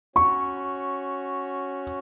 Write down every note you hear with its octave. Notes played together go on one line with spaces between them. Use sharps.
C#4 F#4 C#5 C#6